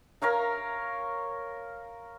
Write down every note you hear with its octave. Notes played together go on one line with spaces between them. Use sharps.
A#4 C#5 F5 A#5